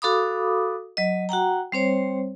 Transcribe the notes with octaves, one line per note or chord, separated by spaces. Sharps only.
F#4 A4 F5 B5 D6 D#6
F#3 D#5
F#4 F#5 G5 A#5
G3 C4 C5 C#5